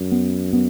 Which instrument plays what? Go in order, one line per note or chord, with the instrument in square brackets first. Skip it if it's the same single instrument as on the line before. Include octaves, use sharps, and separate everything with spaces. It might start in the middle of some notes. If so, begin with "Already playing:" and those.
Already playing: [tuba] F#2
[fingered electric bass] B3
B3